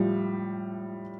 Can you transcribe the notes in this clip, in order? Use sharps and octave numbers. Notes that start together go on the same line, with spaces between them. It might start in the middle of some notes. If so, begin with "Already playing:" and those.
Already playing: A2 F3 G3